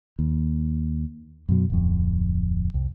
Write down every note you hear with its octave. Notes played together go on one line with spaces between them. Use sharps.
D#2
F#2 B2 F#3
D1 F2
C2